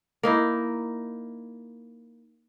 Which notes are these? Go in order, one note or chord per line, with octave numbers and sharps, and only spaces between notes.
A#3 D#4 E4